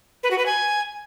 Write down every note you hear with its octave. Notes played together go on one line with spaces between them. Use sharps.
B4
F#4
B4
G#5